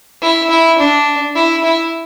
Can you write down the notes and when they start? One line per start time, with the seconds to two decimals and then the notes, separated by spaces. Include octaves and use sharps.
0.22 E4
0.50 E4
0.78 D4
1.35 E4
1.64 E4